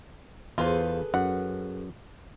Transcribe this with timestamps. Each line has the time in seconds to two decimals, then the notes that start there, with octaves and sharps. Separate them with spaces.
0.58 E2 F4 G#4 A4 B4 C5
1.14 F#2 F#5